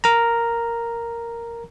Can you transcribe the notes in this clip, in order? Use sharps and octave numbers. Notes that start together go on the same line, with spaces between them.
A#4 A#5